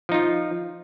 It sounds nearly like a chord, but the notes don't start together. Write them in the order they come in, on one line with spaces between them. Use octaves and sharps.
F3 D#4 F4